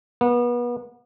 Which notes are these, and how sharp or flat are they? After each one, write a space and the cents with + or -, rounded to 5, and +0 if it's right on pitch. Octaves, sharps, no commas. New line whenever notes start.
B3 -30